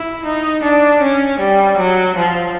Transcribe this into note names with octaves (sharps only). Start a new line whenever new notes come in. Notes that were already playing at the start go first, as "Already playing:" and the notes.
Already playing: E4
D#4
D4
C#4
G3
F#3
F3